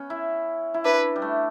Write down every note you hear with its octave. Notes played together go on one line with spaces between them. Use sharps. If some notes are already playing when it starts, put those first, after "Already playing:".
Already playing: B3 C#4
E4
E4
D4 B4
G3
A3